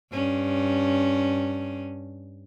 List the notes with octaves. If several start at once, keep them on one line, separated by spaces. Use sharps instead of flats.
G2 C#4